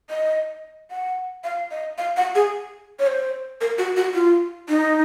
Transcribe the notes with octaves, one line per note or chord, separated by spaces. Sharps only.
D#5
F#5
F5
D#5
F5
F#5
G#4
C#5
C5
A#4
F#4
F#4
F4
D#4